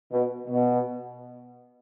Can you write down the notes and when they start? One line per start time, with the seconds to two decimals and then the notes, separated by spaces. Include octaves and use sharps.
0.12 B2
0.48 B2